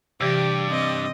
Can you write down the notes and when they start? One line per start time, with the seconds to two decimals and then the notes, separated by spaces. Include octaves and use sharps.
0.21 G2 C3 E3 G4 D5 D6 E6
0.70 C4 D#5